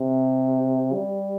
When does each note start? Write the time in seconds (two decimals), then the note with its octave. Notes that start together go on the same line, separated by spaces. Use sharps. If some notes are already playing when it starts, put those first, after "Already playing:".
Already playing: C3
0.94 G3